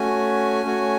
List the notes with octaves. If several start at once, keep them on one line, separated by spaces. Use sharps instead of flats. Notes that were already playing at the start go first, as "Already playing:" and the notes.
Already playing: A3 C#4 F#4 G#5
A3 C#4 F#4